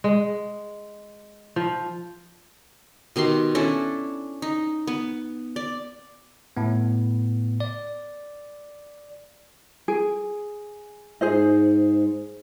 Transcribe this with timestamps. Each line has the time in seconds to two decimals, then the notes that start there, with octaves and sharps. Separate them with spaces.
0.04 G#3
1.56 F3
3.16 B2 D#3 G4 C6
3.55 C#4 D4 E4 A4
4.42 D#4
4.87 B3
5.56 D5
6.57 A2 B3
7.60 D5
9.88 G#4
11.21 G#2 G#4 C5 D#5